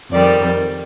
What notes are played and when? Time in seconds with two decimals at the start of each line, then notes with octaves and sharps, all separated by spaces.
0.11 F2 D#3 G3 D5